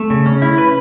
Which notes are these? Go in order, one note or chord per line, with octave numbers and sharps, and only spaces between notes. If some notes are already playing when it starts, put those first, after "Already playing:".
Already playing: A3
C#3
C#4
E4
B4